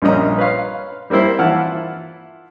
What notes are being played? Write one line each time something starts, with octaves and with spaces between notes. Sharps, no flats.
A#1 G2 A#2 C#4 D#5 A#5
B4 C#5 F5 C6
G3 A#3 C4 E4 C5
E3 E4 F4 F#5 A5 F6